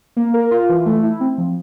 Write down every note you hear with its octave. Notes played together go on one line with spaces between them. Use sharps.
A#3
A#4
F4
E3
A3
E4
C4
F3